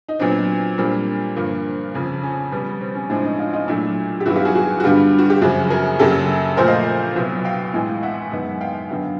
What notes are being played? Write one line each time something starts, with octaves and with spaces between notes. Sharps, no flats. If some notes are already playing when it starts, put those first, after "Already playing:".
D#4
A#2 F#3 B3 C4 D4
A#2 G3 A#3 C4 D4
G2 D3 F3 A#3
F2 C#3 F3
C#4
B2 G3 B3
C4
C#4
A2 F3 G#3 C4 D4
C#4 D#4
D#4 F4
D#4 F4
A#2 F#3 A3 D4 E4
G4
G2 D#3 F#3 B3 E4 F#4
F4 G4
F#4 G#4
F#4 G#4
F#4
G2 D3 G3 B3 F4 G4
F#4
G4
F#2 C#3 F3 F#4 G#4
G#4 A#4
F#2 C#3 F#3 A#3 G4 A4
A#2 F3 A3 A#4 C5
D#5 F5
C2 B2 F#3
F5 G5
A2 E3 G#3
E5 F#5
F#2 D#3 G#3 B3
F5 G5
F#2 D3 F#3 B3